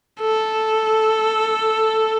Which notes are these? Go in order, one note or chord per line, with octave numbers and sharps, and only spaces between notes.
A4